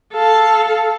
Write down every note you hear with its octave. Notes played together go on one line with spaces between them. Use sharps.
A4 F5